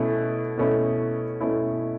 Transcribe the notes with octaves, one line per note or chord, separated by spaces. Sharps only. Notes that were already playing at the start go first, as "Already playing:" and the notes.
Already playing: B2 A3 C#4 E4
B2 A3 C#4 E4
B2 A3 C#4 E4